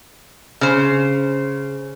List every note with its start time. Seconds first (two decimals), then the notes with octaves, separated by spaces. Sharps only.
0.61 C#3 C5